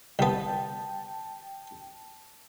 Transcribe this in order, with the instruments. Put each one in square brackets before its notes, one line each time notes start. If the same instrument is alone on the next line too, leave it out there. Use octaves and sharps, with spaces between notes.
[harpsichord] C2 B3 [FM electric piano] G5 A5